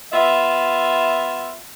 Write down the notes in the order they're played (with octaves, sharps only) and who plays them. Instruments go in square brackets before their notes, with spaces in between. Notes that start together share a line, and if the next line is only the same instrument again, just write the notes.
[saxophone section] B3 F4 E5